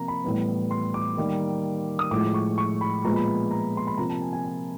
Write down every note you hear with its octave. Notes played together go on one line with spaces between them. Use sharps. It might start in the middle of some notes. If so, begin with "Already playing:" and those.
Already playing: C3 F3 A#3 A#5
B5
A2 E3 G3 B3
C6
D6
D#3 G3 A#3
D#6
A2 F3 G#3 D6
C#6
C#6
B5
A#2 F3 G#3 B3 A#5
B5
A#5
C6
B5
C3 F3 A#3 A#5
A5
G#5
G#5
G#5